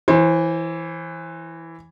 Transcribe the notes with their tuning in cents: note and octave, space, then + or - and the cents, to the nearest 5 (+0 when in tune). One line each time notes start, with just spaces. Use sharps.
E3 +0 C5 +30